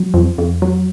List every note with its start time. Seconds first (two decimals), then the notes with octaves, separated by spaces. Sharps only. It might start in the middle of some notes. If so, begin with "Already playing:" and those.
Already playing: F#3
0.14 F2
0.38 F2
0.62 F#3